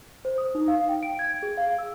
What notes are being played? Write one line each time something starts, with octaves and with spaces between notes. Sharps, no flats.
C5
D#6
D#4
F5
G5
D7
G#6
G#4
F5
E6